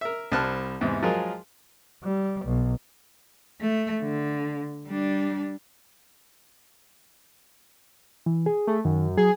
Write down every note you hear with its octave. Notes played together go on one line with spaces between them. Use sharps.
A#4 E5
C2 G3 C4 A5 F6 F#6
E2 G#2 C3
F3 F#3 G#3 F4 G#4 A#4
G3
B1
A3
D3
G3 D4
E3
G#4
A3
F#2 D#3
F#3 G#4